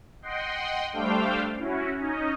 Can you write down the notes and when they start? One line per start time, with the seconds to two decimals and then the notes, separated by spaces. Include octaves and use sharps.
0.22 D#5 F#5 G5 C6
0.93 G3 A3 D4 C5 F5 G5
1.56 C#4 E4 F#4
1.97 C#4 D#4 D#5